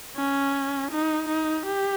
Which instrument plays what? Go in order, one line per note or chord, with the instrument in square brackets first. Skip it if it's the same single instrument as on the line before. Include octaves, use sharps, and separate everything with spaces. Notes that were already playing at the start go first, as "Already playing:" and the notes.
[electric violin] C#4
D#4
D#4
G4